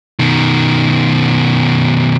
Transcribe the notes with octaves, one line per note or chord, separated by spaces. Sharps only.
B2 D#3